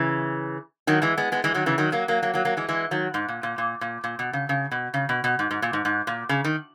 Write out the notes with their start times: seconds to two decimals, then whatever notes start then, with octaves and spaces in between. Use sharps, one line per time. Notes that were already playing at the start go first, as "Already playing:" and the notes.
Already playing: C#3 E3
0.87 D#3 F#3
1.02 E3 G#3
1.17 G#3 B3
1.32 G#3 B3
1.44 E3 G#3
1.54 D#3 F#3
1.66 C#3 E3
1.78 D#3 F#3
1.92 F#3 A#3
2.08 F#3 A#3
2.22 F#3 A#3
2.34 F#3 A#3
2.45 F#3 A#3
2.57 E3 G#3
2.68 E3 G#3
2.91 D#3 F#3
3.14 G#2
3.28 A#2
3.43 A#2
3.58 A#2
3.81 A#2
4.04 A#2
4.19 B2
4.33 C#3
4.49 C#3
4.71 B2
4.94 C#3
5.09 B2
5.24 B2
5.39 G#2
5.51 G#2
5.62 A#2
5.73 G#2
5.85 G#2
6.07 A#2
6.29 C#3
6.44 D#3